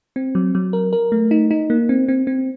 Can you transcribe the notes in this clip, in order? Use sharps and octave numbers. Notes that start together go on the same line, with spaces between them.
C4
F#3
F#3
A#4
A#4
A3
D#4
D#4
A#3
C4
C4
C4